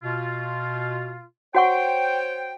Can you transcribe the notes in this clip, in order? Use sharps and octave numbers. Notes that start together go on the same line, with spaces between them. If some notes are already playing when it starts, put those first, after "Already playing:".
B2 F4
F#4 C5 C#5 F#5 G5 C#6